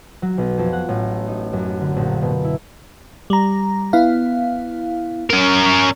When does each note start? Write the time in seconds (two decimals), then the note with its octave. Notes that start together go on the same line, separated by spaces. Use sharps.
0.22 F#3
0.38 B1
0.58 F2
0.73 F#5
0.88 A1
1.28 D#4
1.53 F#2
1.80 D3
1.96 A#1
2.22 B2
2.44 E4
3.30 G3 A#5
3.93 B3 E4 F5
5.30 C#4 A#4